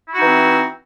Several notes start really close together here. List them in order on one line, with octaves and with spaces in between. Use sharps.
E4 F#4 D#4 E3 C4